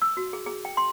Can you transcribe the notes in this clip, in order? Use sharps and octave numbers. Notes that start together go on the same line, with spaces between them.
E6
F#4
G#4
G#4
G5
C6